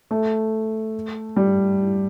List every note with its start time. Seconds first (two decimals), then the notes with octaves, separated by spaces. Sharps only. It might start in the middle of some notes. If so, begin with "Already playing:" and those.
0.11 A3
1.36 G3